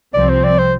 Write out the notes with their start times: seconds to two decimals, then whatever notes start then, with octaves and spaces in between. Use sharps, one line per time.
0.14 C2 C3 F3 C4 D5
0.29 C5
0.44 D5
0.58 C5